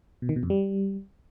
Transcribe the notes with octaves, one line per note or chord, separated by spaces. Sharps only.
B2
D#3
B2
F2
G3